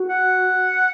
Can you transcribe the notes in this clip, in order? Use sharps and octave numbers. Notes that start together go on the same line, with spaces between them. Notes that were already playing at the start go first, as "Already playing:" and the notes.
Already playing: F#4
F#5